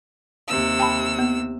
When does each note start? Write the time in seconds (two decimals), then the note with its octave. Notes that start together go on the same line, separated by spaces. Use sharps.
0.48 D#2 C3 E6
0.79 G5 A5 B5
1.19 B3